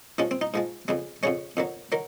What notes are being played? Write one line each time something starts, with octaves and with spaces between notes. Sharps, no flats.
G#2 F3 G#3 C#4
C4
D#4
G#2 F3 G#3
F2 C#3 G#3
F2 C#3 G#3 C#5
F2 D#3 F#3
D#3 F#3 A#4